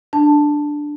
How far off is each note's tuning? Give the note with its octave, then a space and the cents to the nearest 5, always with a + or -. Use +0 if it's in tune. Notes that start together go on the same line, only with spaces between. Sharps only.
D4 +5 A5 +0